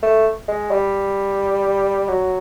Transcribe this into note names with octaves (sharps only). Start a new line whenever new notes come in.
A3
G#3
G3
F#3